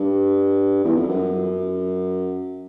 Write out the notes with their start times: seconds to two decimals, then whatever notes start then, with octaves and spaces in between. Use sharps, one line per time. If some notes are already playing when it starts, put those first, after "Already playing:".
Already playing: G2
0.84 E2
0.97 F2
1.09 F#2